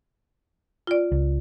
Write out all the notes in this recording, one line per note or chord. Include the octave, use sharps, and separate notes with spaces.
F4 D5
C#2